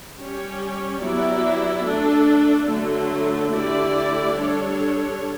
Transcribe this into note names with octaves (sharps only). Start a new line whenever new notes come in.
G3 C#4 G4 C#5
F#3 B3 E4 G4 D5
A3 D4 A4
D3 F#3 A3
D3 A3 E4 G4 D5
G3 D4 A4 C#5